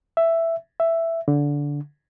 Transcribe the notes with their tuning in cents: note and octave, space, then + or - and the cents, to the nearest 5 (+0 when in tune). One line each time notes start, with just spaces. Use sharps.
E5 +5
E5 +5
D3 -20